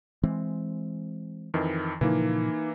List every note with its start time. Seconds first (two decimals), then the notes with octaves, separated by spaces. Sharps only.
0.23 E3 G#3 C4
1.54 F2 D#3 E3
2.01 A#2 C#3 E3 F3 A#3 D#4